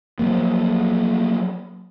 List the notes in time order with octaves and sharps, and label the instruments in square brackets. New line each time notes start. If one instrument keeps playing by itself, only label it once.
[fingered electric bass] F3 F#3 A#3